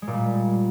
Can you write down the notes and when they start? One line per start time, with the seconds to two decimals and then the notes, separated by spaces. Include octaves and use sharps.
0.02 G#3
0.07 A#2
0.13 G3